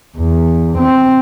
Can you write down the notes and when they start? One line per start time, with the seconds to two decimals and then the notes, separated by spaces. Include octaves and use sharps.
0.18 E2
0.78 C4